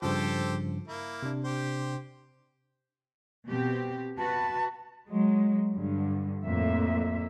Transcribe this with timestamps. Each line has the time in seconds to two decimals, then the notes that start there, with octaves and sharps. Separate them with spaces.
0.02 G2 C#3 F3 G4 A4 C5
0.88 A#3 E4
1.23 C3 D4
1.44 G4 C5
3.45 B2 C4 G4
4.18 F#4 B4 A5
5.09 F#3 G#3
5.75 G2 D3
6.45 F2 A2 A#3 E5